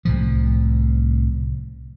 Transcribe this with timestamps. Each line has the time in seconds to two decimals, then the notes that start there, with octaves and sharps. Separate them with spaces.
0.05 C2 A2 F3